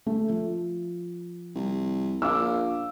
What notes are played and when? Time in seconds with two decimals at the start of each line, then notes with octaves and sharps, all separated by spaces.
0.07 A3
0.29 F3
1.55 C2
2.22 A#1 F5 D6 E6